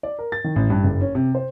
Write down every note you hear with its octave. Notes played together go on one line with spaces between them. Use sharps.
D5
A#4
A6
D#3
A1
G2
F#1
C#4
C3
C5